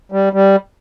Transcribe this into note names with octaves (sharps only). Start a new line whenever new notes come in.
G3
G3